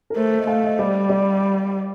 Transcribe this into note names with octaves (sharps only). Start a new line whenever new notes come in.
A#4
A3 C5
D#5
A3 F5
D#5
G3 D5
D5